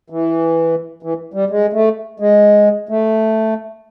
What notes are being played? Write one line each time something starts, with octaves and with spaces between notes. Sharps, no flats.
E3
E3
G3
G#3
A3
G#3
A3